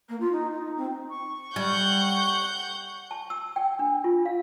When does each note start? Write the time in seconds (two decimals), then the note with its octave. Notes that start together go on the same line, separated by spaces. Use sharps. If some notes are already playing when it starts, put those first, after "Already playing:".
0.09 A#3
0.20 F4
0.32 D#4
0.52 D#4
0.77 C4
1.10 C#6
1.56 G3 F#5 G6
3.11 A5
3.30 E6
3.56 G5
3.79 D4
4.04 F4
4.25 F5